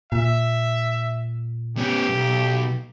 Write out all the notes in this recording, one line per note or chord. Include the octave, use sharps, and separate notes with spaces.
A#2 E5
B3 C#4 G4
B1